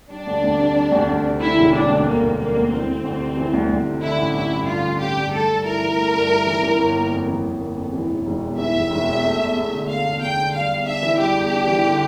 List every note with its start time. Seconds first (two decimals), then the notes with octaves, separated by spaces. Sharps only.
0.10 G3 D4
0.27 D2
0.44 D2
0.59 C3
0.76 G3
0.92 D2
1.09 D2
1.25 C3
1.41 D3 E4
1.58 E1
1.74 G3 D4
1.90 D2
2.06 D3 A#3
2.23 E1
2.38 G3 A#3
2.55 D2
2.71 E3 C4
2.88 D2
3.04 D2
3.20 C3
3.37 E3
3.54 D2
3.69 D2
3.86 C3
4.02 D3 E4
4.18 A1
4.34 A1 E4
4.51 G2
4.67 D3 F4
4.83 A1
4.99 A1 G4
5.15 G2
5.32 A3 A4
5.49 G2
5.65 E4 A#4
5.81 E3
5.97 A3
6.14 G2
6.30 E4
6.47 E3
6.63 E3
6.79 G1
6.95 A#3
7.11 F2
7.28 E3
7.44 G1
7.60 A#3
7.76 F2
7.93 E3
8.10 E1
8.26 E1
8.41 E2
8.58 E3 E5
8.75 E1
8.91 E1
9.07 E2
9.24 A3
9.39 E2
9.56 E2
9.72 D3
9.88 A3 F5
10.05 E2
10.21 E2 G5
10.38 D3
10.54 G3 F5
10.70 E2
10.86 D4 E5
11.03 E3
11.19 G3 G4
11.35 E2
11.52 D4
11.67 E3
11.85 D3